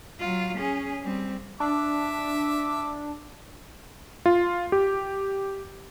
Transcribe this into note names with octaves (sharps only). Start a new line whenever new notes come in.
F#3 F4
C#4 G#4
G3 C4
D4 E5 D6
F4
G4